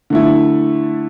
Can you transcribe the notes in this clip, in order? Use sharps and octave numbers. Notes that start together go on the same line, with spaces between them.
D3 A3 E4